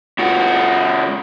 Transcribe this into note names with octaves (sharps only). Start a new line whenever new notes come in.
C#2 F#4